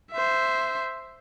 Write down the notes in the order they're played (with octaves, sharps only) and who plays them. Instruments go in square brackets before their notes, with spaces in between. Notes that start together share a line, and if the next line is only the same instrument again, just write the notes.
[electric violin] C5 E5